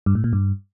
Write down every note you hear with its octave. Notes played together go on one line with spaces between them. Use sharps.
G2
A2
A#2
G2